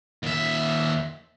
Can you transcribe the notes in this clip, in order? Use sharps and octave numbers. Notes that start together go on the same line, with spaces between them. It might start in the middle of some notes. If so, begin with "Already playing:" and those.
D#2 E5